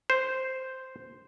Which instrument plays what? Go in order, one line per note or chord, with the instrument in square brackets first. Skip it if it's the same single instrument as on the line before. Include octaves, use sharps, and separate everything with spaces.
[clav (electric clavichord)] C5